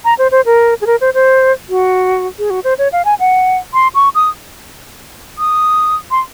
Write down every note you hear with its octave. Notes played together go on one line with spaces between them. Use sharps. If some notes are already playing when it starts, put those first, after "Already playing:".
A#5
C5
C5
A#4
G#4
A#4
C5
C5
F#4
G#4
F#4
C5
C#5
F5
G#5
F#5
C6
C#6
D#6
D#6
C6